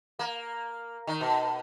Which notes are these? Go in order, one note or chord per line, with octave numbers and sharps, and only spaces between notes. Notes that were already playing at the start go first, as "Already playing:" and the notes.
A#3
D#3
B2